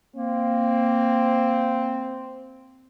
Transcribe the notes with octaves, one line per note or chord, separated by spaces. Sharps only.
A#3 C4